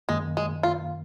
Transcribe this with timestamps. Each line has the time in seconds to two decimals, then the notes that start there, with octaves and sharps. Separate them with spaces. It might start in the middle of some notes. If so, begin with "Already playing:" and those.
0.09 F#2 D#3 G#3 A#3
0.37 G#3
0.63 F4